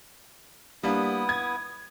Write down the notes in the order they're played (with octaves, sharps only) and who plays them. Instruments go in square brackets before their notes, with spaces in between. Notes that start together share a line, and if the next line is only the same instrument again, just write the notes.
[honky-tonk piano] G3 A#3 D4 [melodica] B3 E4 D#6
[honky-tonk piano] G#6